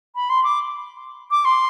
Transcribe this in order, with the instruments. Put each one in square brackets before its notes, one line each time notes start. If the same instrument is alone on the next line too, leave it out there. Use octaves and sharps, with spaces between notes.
[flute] B5
C6
D6
D6
C6